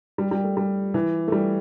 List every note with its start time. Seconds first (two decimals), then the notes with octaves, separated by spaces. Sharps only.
0.18 G3
0.31 G3
0.44 A3
0.57 G3
0.94 E3
1.28 A3
1.32 G3